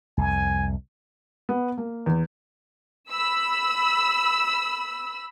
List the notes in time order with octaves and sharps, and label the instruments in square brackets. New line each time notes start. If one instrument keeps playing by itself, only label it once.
[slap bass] C2 F2 [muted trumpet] G#5
[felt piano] B3
A#3
E2
[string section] B5 E6